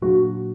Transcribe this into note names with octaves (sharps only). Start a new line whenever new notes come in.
A#2 F#3 A#3 D4 F#4